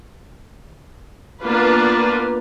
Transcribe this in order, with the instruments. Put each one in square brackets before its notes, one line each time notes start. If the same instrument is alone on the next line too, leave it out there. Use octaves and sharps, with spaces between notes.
[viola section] A#3 B3 D4 F4 B4